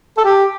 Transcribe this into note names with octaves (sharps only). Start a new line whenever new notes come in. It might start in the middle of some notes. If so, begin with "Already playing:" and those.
A4
G4